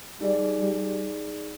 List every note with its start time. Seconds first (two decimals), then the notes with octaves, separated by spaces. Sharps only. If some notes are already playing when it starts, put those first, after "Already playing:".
0.21 G3 D#4 G#4 D5
0.60 G3